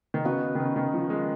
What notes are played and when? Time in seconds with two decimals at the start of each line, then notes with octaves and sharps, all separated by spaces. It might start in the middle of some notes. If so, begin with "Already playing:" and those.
0.14 D#3
0.25 C#3 B3 F#4 B4 D#5
0.55 D#3
0.59 C#3
0.76 D#3
0.94 F3
1.10 G#3